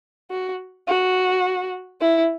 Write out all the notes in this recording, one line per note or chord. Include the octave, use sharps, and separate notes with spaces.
F#4
F#4
E4